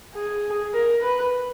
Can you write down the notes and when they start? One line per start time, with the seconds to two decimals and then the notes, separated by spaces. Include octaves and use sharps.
0.15 G#4
0.74 A#4
1.03 B4